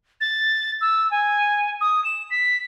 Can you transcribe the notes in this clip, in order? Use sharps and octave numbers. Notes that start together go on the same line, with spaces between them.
A6
E6
G#5
D#6
E7
B6